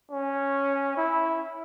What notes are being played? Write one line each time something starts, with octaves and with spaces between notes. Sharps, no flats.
C#4
E4